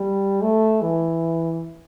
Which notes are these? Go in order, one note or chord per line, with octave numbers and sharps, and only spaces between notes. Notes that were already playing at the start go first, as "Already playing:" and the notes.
Already playing: G3
A3
E3